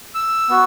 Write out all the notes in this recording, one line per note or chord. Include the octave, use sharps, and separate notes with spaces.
E6
B3 F#4